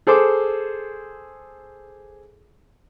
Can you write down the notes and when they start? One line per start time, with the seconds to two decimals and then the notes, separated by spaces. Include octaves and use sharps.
0.07 G#4 A4 C5 D6